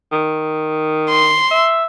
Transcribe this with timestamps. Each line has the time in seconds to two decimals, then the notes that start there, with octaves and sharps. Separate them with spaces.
0.12 D#3
1.10 C6
1.51 E5